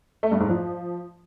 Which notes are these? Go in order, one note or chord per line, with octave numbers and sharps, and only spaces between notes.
A3
G2
G#2
F3